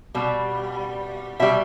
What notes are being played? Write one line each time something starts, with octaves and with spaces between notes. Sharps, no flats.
B2 G3
B2 G3 E5